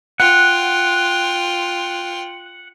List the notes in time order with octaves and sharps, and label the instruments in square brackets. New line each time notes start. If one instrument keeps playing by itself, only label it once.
[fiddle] F4 G5 [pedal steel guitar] F#5